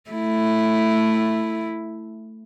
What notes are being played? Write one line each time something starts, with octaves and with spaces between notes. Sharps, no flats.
A3 E4